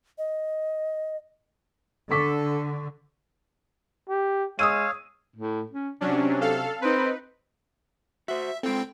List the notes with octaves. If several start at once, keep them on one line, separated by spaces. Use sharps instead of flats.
D#5
D3 A4 C#6 D6 B6
G4
G#3 C#5 F5 D#6 E6 D#7
A2
C#4
C3 F#3 C#4 D4
A4 F5
C4 D#4 B4
F#4 C5 E5
G#3 C4 F4 A4 G5